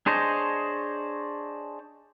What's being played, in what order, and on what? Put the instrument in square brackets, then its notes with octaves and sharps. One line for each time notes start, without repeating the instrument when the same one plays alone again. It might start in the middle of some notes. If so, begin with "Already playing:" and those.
[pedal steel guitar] D4 G#4 C5 C#5 D#5